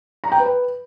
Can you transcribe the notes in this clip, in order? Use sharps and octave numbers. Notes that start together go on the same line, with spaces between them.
A#5
G5
B4